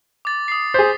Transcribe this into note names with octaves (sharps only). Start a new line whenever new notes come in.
D6 A6
D#6 C7
G#4 C5 B6